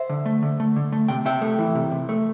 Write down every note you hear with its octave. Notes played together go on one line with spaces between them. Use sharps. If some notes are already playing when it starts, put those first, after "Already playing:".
Already playing: C5 E5
D3
A3
D3
A3
D3
A3
C3 G5
C3 E5 G5
A3
E3
C3
C3
A3